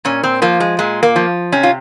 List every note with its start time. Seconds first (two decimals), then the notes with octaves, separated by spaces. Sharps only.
0.05 A#2 C#4
0.24 C4
0.42 F3 A#3
0.60 G#3
0.79 A#2 G#3
1.03 A#3
1.16 F3
1.52 C3 C#4
1.63 F4